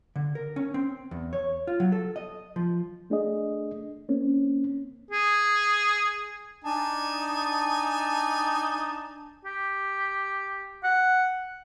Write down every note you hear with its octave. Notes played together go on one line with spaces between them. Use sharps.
D3
A#4
C#4
C4
E2
C#5
F4
F#3
A4
D#5
F3
A3 D4 G#4 D#5
A#3 C4 C#4
G#4
D4 D#4 G#5 A5
G4
F#5